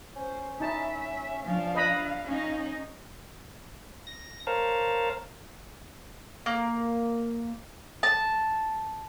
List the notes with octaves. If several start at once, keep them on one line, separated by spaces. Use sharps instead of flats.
C#4 C5
D#4 E4 E5 A5
F3 D4 F5
B4 D#5 B5
C#4 D#4
A#6
A#4 C5 C#5 F5 A5 A#5
A#3
A5